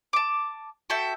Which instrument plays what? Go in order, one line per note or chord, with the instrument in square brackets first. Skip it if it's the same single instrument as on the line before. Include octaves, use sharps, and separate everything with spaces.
[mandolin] A5 D6
F#4 A4 E5 G5